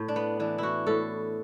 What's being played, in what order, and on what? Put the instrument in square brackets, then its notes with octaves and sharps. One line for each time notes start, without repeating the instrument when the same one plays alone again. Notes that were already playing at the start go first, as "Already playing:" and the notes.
Already playing: [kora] A2
D4
B3
E3 D4
E4 F#4
A2 A4